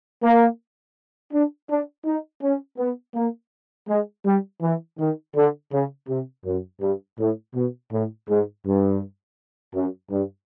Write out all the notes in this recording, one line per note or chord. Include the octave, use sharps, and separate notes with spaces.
A#3
D4
D4
D#4
C#4
B3
A#3
G#3
G3
E3
D#3
D3
C#3
C3
F#2
G2
A2
B2
A2
G#2
G2
F#2
G2